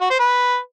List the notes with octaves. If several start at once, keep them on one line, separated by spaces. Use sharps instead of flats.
F#4
C5
B4